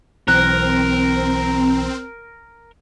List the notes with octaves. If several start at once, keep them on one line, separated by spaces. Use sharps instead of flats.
B1 E3 C4 A#4 F#6 A#6